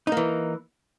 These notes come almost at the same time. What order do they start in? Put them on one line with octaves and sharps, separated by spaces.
D#4 A#3 E3